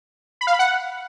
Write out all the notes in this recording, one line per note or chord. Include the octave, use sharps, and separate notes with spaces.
B5
F5
B5
F#5